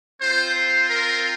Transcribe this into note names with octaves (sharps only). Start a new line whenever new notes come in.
C4 F4 C5
C5
A#4